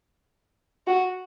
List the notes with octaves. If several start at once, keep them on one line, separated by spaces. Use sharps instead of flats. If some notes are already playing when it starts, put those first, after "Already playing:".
F#4